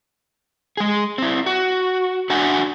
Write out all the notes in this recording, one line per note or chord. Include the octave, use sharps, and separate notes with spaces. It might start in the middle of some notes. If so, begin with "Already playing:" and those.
G#3 G#4
C4 E4
F#4
D4 F#4 E5 F#5 G#5